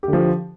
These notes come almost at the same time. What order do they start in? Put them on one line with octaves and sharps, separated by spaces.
G4 D3 F3